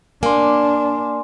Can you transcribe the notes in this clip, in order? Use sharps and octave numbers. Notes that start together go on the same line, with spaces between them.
A#3 D4 G#5 C6